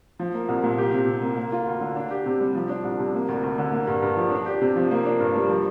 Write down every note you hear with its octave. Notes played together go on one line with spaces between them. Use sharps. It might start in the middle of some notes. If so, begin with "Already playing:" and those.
F3
A#3
C2
A#2
G4
C3
C3
A#3
A#3
F4
D2
D3
D4
G4
C3
G3
F3
D4
C2
C3
A#3
D2
D2
D3
A#3
G2
G2
F3
D4
G4
C3
F3
A#3
D4
G2
G3
F3